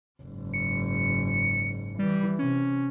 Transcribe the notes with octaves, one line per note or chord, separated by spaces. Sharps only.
F#1 G#2
C#7
E3 G3
C3 C#4